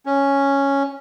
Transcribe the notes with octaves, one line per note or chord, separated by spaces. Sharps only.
C#4